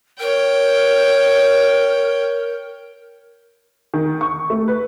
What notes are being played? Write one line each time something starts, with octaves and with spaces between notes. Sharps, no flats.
A#4 C#5 G5
D#3
C#6
A3
B4